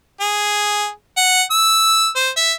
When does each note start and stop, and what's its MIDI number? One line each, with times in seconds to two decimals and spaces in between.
0.20 0.88 68
1.17 1.42 78
1.51 2.09 88
2.16 2.30 72
2.37 2.52 76